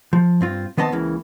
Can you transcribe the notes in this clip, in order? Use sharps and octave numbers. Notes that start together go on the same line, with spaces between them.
F3
G2 C4 F4
D#3 B3 C4 D#5 A5
C#2 C#3 E3 A#3